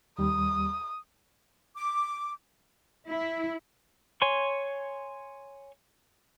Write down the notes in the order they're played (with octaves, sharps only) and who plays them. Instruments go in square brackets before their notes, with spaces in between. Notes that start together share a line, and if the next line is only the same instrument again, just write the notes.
[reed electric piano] D#2 G3 [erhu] D#6
[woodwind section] D6
[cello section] E4
[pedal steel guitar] C#5 G#5 C6 C#6